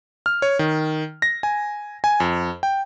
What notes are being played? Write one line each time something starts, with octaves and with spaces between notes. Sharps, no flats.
F6
C#5
D#3
A#6
G#5
G#5
F2
G5